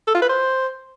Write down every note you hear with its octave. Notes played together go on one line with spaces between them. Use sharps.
A4
F4
B4
C5